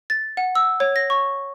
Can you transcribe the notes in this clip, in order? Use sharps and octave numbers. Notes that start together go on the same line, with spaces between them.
A6
F#5
E6
C#5
A#6
C#6